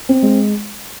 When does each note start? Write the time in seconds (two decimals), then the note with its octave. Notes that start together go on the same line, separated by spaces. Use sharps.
0.09 C4
0.23 G#3